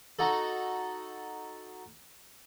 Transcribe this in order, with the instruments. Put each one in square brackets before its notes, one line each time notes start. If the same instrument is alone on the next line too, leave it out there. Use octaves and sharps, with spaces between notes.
[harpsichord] D#4 F#4 A4